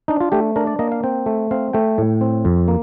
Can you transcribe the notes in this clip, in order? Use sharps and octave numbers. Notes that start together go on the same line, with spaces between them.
D4 D#4
F4
A3 G4
D4 A#4
D5
A#3 D#5
F5
C4 G5
A3
C4 F5
A3 G5
A2
C4
F2
A#3